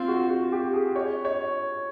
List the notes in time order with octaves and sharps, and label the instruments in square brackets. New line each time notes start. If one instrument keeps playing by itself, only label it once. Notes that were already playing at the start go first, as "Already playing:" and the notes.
Already playing: [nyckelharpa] C4 [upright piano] F4
[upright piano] F#4
F#4
G4
G#4
C#5
C#5